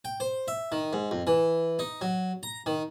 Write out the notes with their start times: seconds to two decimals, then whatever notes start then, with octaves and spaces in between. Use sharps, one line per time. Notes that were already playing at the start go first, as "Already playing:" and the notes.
0.05 G5
0.20 C5
0.48 E5
0.72 D#3
0.93 G#2
1.11 F2
1.27 E3
1.79 D#4
2.01 F#3
2.43 A#5
2.66 D#3